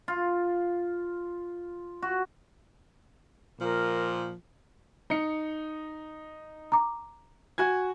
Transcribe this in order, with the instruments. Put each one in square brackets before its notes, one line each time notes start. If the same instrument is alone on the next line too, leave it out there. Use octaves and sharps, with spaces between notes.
[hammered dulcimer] F4
F#4
[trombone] A#2 [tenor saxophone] F3 [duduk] A#4
[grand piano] D#4 C#7
[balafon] A#5 D6
[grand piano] F#4 G#5 G#6